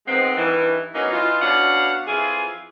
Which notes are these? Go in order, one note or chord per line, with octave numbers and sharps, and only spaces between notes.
D#3 F3 G#3 B3 C4
G2 D#3 E3
F#3 A#3 B3 C#4 D#4
E3 D#4 F4
B2 C#4 D4 F5 F#5
F2 E3 F4 G#4